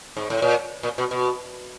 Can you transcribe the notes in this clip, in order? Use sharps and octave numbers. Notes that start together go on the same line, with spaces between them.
G#2
A2
A#2
A#2
B2
B2